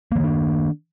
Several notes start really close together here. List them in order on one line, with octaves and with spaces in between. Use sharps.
A#3 E3 D#3 D4